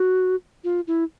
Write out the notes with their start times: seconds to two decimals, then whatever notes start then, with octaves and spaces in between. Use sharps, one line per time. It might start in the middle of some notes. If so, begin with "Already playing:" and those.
Already playing: F#4
0.64 F4
0.87 E4